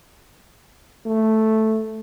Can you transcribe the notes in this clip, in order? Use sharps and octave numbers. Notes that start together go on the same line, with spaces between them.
A3